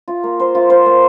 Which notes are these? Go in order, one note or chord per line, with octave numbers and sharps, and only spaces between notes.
F4
A#3
C5
F4
C5
A#3